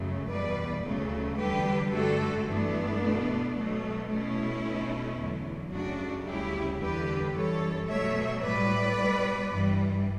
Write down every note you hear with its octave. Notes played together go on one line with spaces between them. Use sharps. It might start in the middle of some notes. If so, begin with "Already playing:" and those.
Already playing: F#2 C#3 F#3 A3
E2 B2 G3 B4 D5
D2 C#3 F#3 A3
E2 D3 G3 G4 B4
G2 D3 A3 F#4 A4
G2 E3 A3 B3 D4
B2 A3
B2 F#3 A3
B2 A3 C#4 E4
B2 A3
E2 D3 F#3
F#2 C#3 F#3 A3 D4 F#4
D2 C#3 G3 E4 G4
E2 D3 G3 G4 B4
F#2 E3 G3 A4 C#5
B2 F#3 A3 C#5 E5
A2 G3 B4 D5
B2 G3
G2 E3 G3